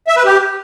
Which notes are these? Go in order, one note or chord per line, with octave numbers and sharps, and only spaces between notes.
E5
B4
G4